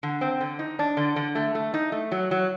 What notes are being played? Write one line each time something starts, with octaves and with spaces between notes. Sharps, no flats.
D3
C4
D3
D#4
D4
D3
D3
A3
A3
D#4
A3
F#3
F#3